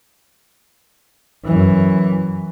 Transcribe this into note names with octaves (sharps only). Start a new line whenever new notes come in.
F#2 E3